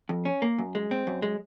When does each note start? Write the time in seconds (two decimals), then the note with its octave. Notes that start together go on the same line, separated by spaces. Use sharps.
0.09 F2
0.25 C#4
0.42 A#3
0.58 F#2
0.75 G#3
0.91 C4
1.07 F#2
1.22 G#3